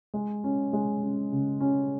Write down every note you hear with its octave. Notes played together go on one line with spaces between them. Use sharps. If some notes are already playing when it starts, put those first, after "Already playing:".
G#3
C#4
G#3
C#4
C#3
C#4